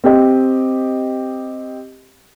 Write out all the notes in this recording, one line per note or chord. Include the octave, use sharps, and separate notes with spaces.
C4 G4 D#5